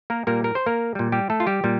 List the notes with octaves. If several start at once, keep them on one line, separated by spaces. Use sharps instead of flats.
A#3 A#4
A#2 G3 A#3 A#4
A#4
C5
A#3 A#4
A#2 G3
G3 G4
A3 A4
F4
G3 G4
A#2 G3